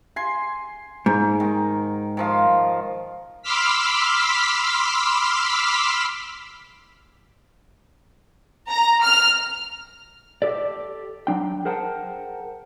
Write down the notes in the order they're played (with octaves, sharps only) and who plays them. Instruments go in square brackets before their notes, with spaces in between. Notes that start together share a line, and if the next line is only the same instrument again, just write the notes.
[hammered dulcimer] G#5 C6
[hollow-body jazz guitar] G#2
[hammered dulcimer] D#3
D#3 F3 F5
[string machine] B5 C6 D6 E6 F6 B6
[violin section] A#5
F6
[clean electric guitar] G4 A4 D5
F#3 D4 G5
G#4 A#4 C5 F#5 G5 A5